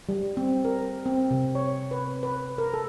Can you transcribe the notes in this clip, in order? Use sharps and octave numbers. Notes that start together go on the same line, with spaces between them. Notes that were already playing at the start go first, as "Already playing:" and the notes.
G3
C4
A#4
C4
C3
C#5
B4
B4
A#4
A4